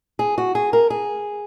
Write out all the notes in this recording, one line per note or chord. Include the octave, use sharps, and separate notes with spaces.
G#4
F#4
G#4
A#4
G#4